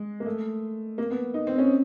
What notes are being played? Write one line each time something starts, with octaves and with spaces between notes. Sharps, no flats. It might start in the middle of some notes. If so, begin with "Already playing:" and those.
Already playing: G#3
A#3
A3
A#3
B3
D#4
C4
C#4